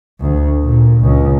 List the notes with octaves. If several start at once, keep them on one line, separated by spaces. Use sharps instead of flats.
D2
A#2
C#2